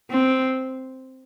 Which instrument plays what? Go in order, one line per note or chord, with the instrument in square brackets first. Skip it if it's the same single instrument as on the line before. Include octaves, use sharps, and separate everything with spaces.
[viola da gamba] C4